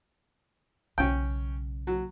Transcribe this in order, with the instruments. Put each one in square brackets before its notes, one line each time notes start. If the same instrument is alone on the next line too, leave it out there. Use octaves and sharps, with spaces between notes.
[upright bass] B1 C#3 [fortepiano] C#4 G5
[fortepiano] F#3